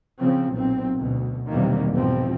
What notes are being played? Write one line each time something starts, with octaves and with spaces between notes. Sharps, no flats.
C#3 F3 C4
B1 A#2 C4
D2 B2
B1 E2 C3 D#3 G3 A#3
E2 G#2 B2 F3 C4